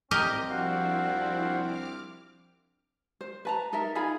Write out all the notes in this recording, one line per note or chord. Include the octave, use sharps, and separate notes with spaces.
C2 C4 G4 A#4 D#5
F3 D4 E4 F#4 F5
D6 F6
C5
B4 A5 A#5
D#4 A4 A#4 E5
D#4 F4 G#4 B5